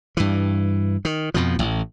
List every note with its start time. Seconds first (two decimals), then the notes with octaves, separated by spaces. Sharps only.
0.17 G2 E3
1.05 D#3
1.34 F2 B2 F3
1.59 A1